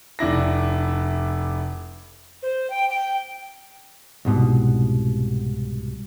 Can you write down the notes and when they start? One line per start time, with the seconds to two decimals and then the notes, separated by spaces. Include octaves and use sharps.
0.19 F1 D4 E4 A#6
2.43 C5
2.70 G5
2.89 G5
4.25 C2 G#2 B2